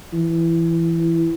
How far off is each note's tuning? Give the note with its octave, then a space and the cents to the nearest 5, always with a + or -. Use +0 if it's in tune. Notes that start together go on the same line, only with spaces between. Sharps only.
E3 +10